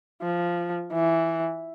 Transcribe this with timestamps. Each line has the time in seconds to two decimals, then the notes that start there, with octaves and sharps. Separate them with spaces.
0.23 F3
0.93 E3